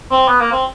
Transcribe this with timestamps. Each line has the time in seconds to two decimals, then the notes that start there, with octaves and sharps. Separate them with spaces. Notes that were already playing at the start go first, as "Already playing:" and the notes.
0.11 C4
0.28 B3
0.41 A#3
0.52 C4